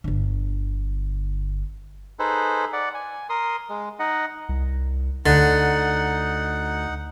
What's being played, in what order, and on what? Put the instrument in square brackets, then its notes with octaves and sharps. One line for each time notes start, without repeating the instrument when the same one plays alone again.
[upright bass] G1 D3
[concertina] D#4 G#4 A4 B4 C5
D5 F#5
G#5
A#4 C6 D#6
G#3
D#4 D#5 F#5
[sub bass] C2
[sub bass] D2 [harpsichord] D3 [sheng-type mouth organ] D#4 F#5